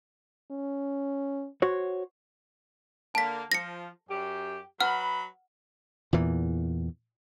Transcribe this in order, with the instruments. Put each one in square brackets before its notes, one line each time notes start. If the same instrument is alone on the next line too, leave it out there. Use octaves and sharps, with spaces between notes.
[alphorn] C#4
[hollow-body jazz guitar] F#4 C5 C#5
[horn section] D3 A#3 [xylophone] A5 B6
[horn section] F3 [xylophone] A#6 C#7
[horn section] F#2 G4
[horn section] F#3 B4 B5 [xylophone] F#5 F6
[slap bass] E2 A#2 E3